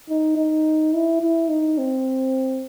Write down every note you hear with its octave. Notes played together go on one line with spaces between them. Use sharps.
D#4
D#4
E4
E4
D#4
C4